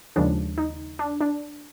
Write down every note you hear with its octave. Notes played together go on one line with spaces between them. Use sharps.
D#2 C#3 F3 G#3 D4
D#4
D4
D4